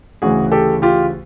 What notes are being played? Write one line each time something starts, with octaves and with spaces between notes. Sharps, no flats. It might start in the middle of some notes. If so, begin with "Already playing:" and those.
D2 C#3 E3 F#4 G#4
G4 A4
F4 G4